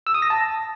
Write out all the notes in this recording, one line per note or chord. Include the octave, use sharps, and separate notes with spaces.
E6
D#6
A#6
A5